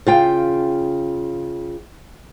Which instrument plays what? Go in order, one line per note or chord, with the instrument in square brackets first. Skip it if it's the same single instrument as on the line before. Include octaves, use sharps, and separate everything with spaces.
[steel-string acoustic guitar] C#3 F4 G5